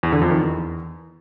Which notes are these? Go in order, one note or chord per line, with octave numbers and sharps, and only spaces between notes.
E2
D3
F2
D#3
E2